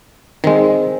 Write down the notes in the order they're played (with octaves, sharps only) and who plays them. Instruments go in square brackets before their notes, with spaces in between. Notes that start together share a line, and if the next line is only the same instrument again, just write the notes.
[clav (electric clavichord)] D#3 G#3 [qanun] C4